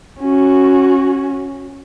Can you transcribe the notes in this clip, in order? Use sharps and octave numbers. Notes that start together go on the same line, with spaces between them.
C#4 F#4